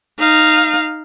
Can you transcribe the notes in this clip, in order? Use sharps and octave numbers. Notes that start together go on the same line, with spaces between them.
D#4 F5